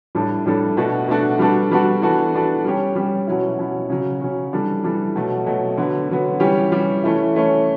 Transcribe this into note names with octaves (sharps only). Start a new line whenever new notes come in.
A2 G3 D4 A4
A2 G3 D4 A4
B2 A3 D4 F#4 A4
B2 A3 D4 F#4 A4
G3 B3 D4 F#4 A4
G3 B3 D4 F#4 A4
E3 B3 D4 F#4 A4
E3 B3 D4 F#4 A4
G3 C#4 G4
G3 C#4 G4
B2 F#3 C#4 E4
B2 F#3 C#4 E4
C#3 F#3 C#4
C#3 F#3 C#4
E3 G3 D4 A4
E3 G3 D4 A4
B2 F#3 A3
B2 F#3 A3
D3 F#3 B3
D3 F#3 B3
E3 G3 C#4 G4
E3 G3 C#4 G4
E3 A3 C#4 E4
E3 A3 C#4 E4